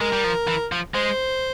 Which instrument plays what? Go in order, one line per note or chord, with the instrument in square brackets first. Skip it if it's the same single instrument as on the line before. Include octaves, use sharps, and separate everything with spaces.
[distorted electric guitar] G#3 [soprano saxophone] A#4
[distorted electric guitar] G3
F3
E3
F3
[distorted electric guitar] G#3 [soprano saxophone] C5